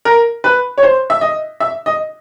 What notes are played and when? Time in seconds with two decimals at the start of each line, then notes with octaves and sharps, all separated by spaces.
0.05 A#4
0.44 B4
0.78 C#5
0.83 C5
1.10 E5
1.21 D#5
1.60 E5
1.86 D#5